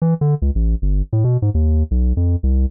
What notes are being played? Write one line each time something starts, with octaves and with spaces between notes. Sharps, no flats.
E3
D3
C#2
A1
G1
A2
B2
G#2
D#2
B1
F2
C2